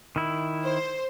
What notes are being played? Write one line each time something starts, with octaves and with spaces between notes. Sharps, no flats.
D#3 E4
C5